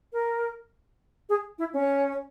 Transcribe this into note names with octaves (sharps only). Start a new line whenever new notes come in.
A#4
G#4
E4
C#4